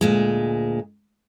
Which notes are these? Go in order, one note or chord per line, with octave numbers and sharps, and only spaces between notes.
D2 A#2 G#3